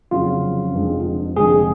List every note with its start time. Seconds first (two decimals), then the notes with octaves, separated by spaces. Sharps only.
0.11 F1 F2 C#3 F#3 C#4 F4
0.74 F1 F2 D3 G#3
1.36 F1 F2 D3 G#3 G#4